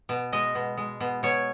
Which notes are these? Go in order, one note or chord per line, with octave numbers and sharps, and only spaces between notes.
B2
G#3 D#5
B2
G#3
B2
B2 C#5